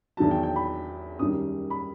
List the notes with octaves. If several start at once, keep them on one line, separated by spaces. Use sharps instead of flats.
E2 D#3 F#3 A5
G5
G5
B5
F#2 D#3 G3 D#6
B5